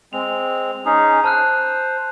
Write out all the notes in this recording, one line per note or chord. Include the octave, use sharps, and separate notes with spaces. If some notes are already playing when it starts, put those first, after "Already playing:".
G#3 C4 F7
C#4 D#4 G#4
C5 A5 F6 F#6